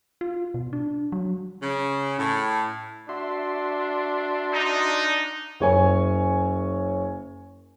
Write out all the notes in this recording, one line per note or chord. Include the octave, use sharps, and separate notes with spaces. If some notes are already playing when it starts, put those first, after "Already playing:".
F4
B2
D4
F#3
C#3
A2
D4 F#4 E5 C6
D#4
F#1 C#5 G#5 C#6